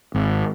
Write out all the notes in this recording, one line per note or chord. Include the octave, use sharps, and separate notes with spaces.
G#1